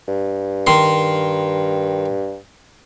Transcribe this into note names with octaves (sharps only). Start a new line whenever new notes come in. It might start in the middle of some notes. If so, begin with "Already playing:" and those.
G2
D#3 C6